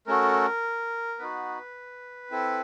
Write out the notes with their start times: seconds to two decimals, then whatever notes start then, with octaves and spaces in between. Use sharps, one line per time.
0.07 A3 C#4 F#4 A4 A#4
1.19 B3 D#4 F#4 B4
2.31 C4 E4 A4